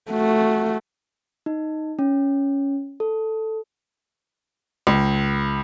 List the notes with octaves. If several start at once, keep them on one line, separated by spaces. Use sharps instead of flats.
A3 F#4
D#4
C#4
A4
C#2